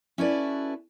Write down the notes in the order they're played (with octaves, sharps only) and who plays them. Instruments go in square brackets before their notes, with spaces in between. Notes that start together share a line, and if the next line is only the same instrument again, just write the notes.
[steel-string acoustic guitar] C#4 E4 F#4 A4 B4 D5